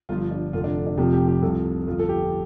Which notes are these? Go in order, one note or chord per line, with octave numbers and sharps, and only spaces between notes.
G1 G2 F3 F4
D4
F1 F2 D3 F4
D4
D4
F1 F2 C3 F3 G4
G4
G4
C2 C3 F3 A4
G1 F2 F3 F4
A4
G4